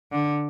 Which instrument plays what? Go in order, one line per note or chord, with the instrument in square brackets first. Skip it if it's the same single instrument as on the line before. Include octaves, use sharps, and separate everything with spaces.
[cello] D3